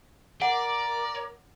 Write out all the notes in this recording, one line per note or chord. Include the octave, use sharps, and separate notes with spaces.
A#4 D5 F#5 A#5 D6